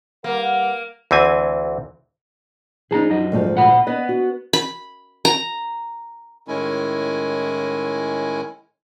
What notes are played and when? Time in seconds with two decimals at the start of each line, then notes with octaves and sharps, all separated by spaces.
0.24 G3 A#3 B4 F#5
1.11 D2 E3 C4 G#5
2.91 F3 D#4 G#4 A5 A#5
3.10 F#2 D#5
3.32 D2 G#2 F3
3.55 A#2 F#5 B5
3.87 B3 B4 D#5
4.09 F#4
4.53 B5
5.25 A#5
6.48 A2 D#3 G#3 C#4 E4 G#5